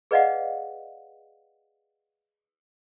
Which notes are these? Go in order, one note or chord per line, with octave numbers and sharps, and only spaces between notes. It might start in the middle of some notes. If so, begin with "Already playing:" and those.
G#4 B4 D5 D#5 F5 F#5